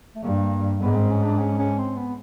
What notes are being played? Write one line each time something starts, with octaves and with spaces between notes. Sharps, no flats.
A3
G2 A#3
G#2 B3
C4
C#4
D4
C#4
C#4
C4
B3